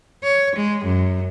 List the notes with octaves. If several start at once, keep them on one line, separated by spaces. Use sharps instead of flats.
C#5
G#3
F#2